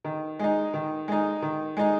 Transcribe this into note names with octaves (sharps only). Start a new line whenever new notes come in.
D#3
G#3 D#4
D#3
G#3 D#4
D#3
G#3 D#4